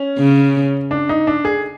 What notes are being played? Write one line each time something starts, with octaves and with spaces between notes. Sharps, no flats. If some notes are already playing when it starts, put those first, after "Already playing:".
Already playing: C#4
C#3
D4
D#4
D4
G#4